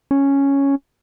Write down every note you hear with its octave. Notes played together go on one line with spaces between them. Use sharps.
C#4